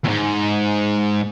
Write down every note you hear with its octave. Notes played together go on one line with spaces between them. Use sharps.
E2 G#2